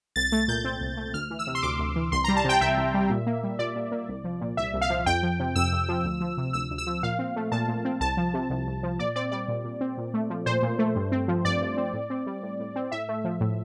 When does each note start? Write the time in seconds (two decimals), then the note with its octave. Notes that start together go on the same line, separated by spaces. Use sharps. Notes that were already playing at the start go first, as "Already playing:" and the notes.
0.16 C2 A6
0.32 A3 A6
0.48 A#2 G6
0.64 C4
0.81 C2
0.97 A3
1.14 D2 F6
1.30 E3
1.39 E6
1.47 C3
1.55 C6
1.63 D2 D6
1.79 D2
1.96 E3
2.12 C2 C6
2.24 G3 A#5
2.36 A5
2.44 C3 G5
2.61 C2 E5
2.78 C2
2.94 G3
3.10 A#2
3.26 A#3
3.43 G3
3.59 A#2 D5
3.76 A#2
3.92 A#3
4.09 C2
4.24 F3
4.41 A#2
4.57 C2 E5
4.74 C2
4.81 F5
4.90 F3
5.06 F2 G5
5.23 F3
5.39 C3
5.56 F2 E6
5.72 F2
5.89 F3
6.04 D2
6.21 F3
6.37 C3
6.53 D2 E6
6.71 D2
6.78 E6
6.87 F3
7.03 A#2 F5
7.19 C4
7.36 A3
7.52 A#2 A5
7.68 A#2
7.85 C4
8.01 C2 A5
8.17 F3
8.34 C3
8.50 C2
8.67 C2
8.83 F3
8.99 A#2 D5
9.16 C4 D5
9.31 G3 D5
9.48 A#2
9.64 A#2
9.81 C4
9.98 A#2
10.14 A3
10.30 F3
10.46 A#2 C5
10.63 A#2
10.79 A3
10.96 G2
11.12 C4
11.28 F3
11.45 G2 D5
11.61 G2
11.77 C4
11.93 A2
12.10 C4
12.27 G3
12.43 A2
12.60 A2
12.76 C4
12.92 A2 E5
13.08 A3
13.24 F3
13.41 A2